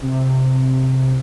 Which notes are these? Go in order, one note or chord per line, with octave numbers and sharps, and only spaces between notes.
C3